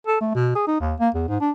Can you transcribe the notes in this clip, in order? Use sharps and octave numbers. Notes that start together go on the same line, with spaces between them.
A4
A3
B2
G#4
D#4
D#2
A#3
E2
G#2
D4